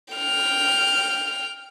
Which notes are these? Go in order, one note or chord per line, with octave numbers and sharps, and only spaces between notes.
G5 F6